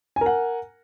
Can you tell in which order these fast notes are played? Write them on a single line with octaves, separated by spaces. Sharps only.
G#5 A#4 F#5